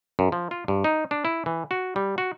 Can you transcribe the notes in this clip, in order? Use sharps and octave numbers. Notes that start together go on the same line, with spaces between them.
F#2
F3
F4
G2
D#4
D4
E4
E3
F#4
G3
F#4